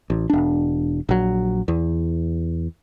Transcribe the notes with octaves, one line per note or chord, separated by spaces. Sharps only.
A1
E1 D4
A#1 F#3
E2